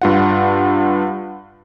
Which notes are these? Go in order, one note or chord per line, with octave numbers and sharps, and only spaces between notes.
G2 F4 F#5